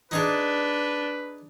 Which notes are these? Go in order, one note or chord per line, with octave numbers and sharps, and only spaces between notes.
D4 D#4 G#4 A4 B4